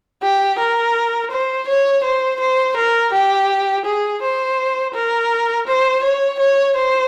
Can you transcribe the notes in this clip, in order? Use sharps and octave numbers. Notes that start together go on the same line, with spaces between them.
G4
A#4
C5
C#5
C5
C5
A#4
G4
G#4
C5
A#4
C5
C#5
C#5
C5